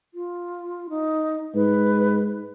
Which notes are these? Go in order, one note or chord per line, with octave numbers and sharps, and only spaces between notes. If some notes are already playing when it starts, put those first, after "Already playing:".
F4
D#4
G#2 B4